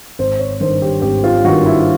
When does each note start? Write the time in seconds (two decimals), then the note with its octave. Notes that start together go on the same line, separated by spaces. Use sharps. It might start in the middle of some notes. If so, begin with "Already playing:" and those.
0.19 G#1 C5
0.39 C#5
0.60 G2 D#3 C5
0.82 G4
1.02 G#1 G4
1.24 F4
1.44 G2 D#3 F#4
1.66 E4